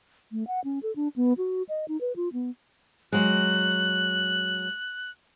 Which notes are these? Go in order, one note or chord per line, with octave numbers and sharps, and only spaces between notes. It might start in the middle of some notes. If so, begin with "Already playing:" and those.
A3
F#5
C#4
A4
D4
B3
F#4
D#5
D#4
B4
F4
B3
F#3 G#3 F#6